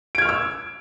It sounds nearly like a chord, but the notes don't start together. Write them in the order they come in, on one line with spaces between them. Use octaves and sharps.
D7 G#6 F6 C#6 E6